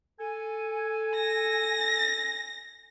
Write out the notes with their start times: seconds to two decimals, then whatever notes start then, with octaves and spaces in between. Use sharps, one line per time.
0.20 A4 G#5
1.14 A#6